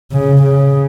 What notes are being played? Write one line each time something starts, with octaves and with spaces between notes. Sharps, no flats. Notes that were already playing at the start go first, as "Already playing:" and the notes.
C#3
C#3